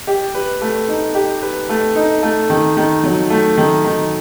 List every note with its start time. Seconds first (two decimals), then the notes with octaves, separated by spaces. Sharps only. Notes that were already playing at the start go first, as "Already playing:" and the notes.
0.07 G4
0.34 B4
0.61 A3
0.88 D#4
1.15 G4
1.42 B4
1.69 A3
1.95 D#4
2.23 A3
2.50 D#3
2.77 D#3
3.04 F#3
3.30 A3
3.57 D#3
3.85 D#3